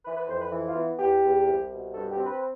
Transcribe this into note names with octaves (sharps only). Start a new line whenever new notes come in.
E3 B4
B4
F2 C5
B4
E3
F4
B3
E2 G4
E2
C2
B2
G2 A4
G4
C4
B4